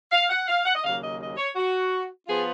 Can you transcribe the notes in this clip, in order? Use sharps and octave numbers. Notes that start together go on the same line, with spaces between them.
F5
F#5
F5
F#5
D#5
D#2 C#3 F#3 A#3 F5
D#5
D#5
C#5
F#4
F3 B3 F4 G#4